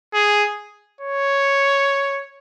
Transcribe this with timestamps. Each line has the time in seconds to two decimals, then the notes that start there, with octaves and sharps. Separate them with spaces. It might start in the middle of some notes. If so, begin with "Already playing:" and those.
0.14 G#4
1.01 C#5